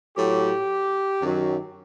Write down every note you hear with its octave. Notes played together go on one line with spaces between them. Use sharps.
A2 F#3 G4
F#2 D#3 F#3